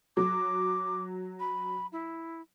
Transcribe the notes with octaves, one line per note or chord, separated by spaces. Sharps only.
F#3 D6
B5
E4